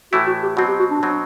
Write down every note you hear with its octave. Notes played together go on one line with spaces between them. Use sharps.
A2 E3 A3 E4 F#4
F#4
G4
B2 F#3 C4 F#4
G4
F#4
D4
B2 F#3 C4